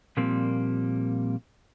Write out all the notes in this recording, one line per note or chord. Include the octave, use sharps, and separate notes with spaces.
A#2 F3 G3 A#3 C4